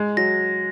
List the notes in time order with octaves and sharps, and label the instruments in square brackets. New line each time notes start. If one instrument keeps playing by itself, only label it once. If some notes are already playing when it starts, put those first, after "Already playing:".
Already playing: [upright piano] G#3
[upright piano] F#3 [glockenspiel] A#6